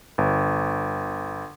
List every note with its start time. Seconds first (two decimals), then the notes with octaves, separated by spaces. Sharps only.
0.18 G1